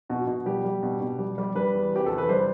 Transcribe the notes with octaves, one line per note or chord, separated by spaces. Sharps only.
B2 F#4
B2
G3 G4
G3
B2
B2
G3
G3
G3 B4
E2
C3 G4
E2 A4
B4
G3 C5